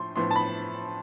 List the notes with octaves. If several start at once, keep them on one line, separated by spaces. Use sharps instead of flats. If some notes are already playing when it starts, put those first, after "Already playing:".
Already playing: A2 F3 C6
A2 F3 B3 C6
A5
B5